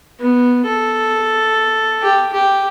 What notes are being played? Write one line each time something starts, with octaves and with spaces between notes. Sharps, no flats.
B3
A4
G4
G4